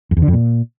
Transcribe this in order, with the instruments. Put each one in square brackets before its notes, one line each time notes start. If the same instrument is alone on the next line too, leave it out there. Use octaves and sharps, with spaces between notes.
[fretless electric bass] F2
E2
D3
F2
A#2